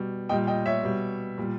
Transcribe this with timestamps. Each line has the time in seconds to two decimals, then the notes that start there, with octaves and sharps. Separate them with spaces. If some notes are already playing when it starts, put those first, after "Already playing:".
Already playing: B2 G3
0.29 A#2 G3 D#5 G5
0.47 D#5 G5
0.66 C#5 E5
0.83 B2 G3
1.38 A#2 G3